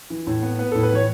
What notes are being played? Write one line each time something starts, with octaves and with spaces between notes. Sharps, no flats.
E3
A2
B3
B3 B4
A2 A4
B4
E3 C#5